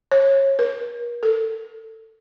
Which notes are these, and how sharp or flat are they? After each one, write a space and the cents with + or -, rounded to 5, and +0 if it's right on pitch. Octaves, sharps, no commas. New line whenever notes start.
C#5 -25
A#4 +40
A4 +20